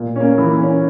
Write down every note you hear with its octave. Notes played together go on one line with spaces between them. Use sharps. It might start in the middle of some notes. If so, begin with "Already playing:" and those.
Already playing: A#2
A#3 C#4
E3
A#3 C#4